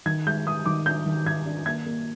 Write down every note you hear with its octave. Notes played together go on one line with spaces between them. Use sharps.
D#3 G#6
G#3 G6
G#3 D#6
D#3 D6
D4 G6
D#3
D#3 G#6
D4
A#3 G#6
A#3